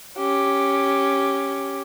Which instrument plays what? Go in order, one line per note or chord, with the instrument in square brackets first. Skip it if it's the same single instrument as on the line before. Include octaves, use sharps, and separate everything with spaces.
[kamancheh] C#4 G4